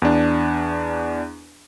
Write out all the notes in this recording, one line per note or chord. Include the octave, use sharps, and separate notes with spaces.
E2 D4